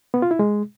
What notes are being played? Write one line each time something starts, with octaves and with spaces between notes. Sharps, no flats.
B3
F4
E4
G#3